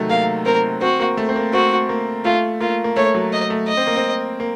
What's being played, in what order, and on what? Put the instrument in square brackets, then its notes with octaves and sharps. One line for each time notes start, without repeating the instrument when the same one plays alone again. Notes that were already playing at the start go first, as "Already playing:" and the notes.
Already playing: [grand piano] C3 D#3 F#3 A3
[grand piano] A#3 [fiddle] F5
[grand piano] C4 [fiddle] A#4
[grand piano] C4 [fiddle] F#4
[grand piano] A#3
A3
C4
A#3
[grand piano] C4 [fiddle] F#4
[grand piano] A#3
[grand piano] A3 [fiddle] F4
[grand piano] A#3 [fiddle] F4
[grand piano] A#3
[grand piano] A3 [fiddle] C#5
[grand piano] F#3
[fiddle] D#5
[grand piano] A3
[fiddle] D#5
[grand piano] C4
A#3
C4
A#3